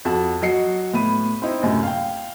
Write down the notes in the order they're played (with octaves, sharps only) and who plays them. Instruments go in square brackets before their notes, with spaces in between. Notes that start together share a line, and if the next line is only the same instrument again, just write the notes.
[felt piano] F2 F#4 A5
F#3 F#4 D#5 C7 C#7
A2 B3 B5 D#7
C4 D#4 E4
F#2 A2 C3
F5 G5